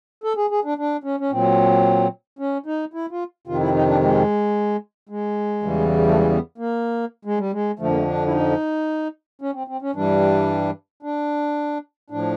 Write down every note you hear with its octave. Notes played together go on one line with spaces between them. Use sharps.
A4
G#4
G#4
D4
D4
C#4
C#4
A#2 F#3 C4
C#4
D#4
E4
F4
F2 C3 D#3 F4
E4
D#4
D4
G#3
G#3
E2 C#3 E3 G3
A3
G#3
B3
A#3
G#3
G3
G#3
F2 D3 F3 A3
A#3
A3
D4
E4
D#4
C#4
C4
C4
C#4
G2 E3 G3 D4
D4
A2 F3 D4